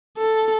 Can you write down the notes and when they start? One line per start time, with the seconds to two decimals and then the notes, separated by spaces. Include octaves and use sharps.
0.18 A4